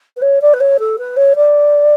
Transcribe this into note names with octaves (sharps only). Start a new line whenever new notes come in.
B4
C#5
D5
B4
C#5
A4
B4
C#5
D5